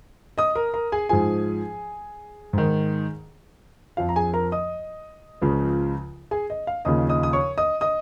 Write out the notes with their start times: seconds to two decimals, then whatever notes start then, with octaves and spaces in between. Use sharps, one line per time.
0.38 D#5 D#6
0.55 A#4 A#5
0.74 A#4 A#5
0.92 G#4 G#5
1.09 G#2 F3 G#4 G#5
2.53 G#2 D#3
3.97 F2 F3 F5
4.09 A#5
4.16 G#4 G#5
4.33 A#4 A#5
4.52 D#5 D#6
5.42 C#2 C#3 F3
6.31 G#4 G#5
6.50 D#5
6.67 F5
6.85 D#2 C#3 F3 D#5 D#6
7.09 D#5 D#6
7.23 D#6
7.33 C#5 C#6
7.58 D#5 D#6
7.81 D#5 D#6